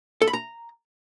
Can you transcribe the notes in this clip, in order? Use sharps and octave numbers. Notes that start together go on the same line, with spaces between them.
A4
B5
A#5